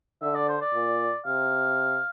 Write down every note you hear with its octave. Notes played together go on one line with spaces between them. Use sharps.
D3 E5
D5
C5
D5
A#2
C3 F5